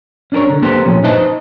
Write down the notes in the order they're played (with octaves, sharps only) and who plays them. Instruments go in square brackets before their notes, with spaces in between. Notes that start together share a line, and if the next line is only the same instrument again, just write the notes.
[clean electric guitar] C#4 D4 G#4 A#4 C#5
D3
A#3 B3 G4 A4 A#4 C5
A#2 F3 C#4
D#4 B4 C5 D#5 E5 A5